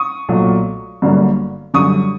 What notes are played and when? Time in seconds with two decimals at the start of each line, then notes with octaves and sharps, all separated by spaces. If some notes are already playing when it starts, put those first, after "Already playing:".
Already playing: C#6 D#6
0.28 B1 A#2 F#3 A3
1.02 G1 G2 D3 F#3 A#3
1.74 F#2 D3 G3 C#6 D#6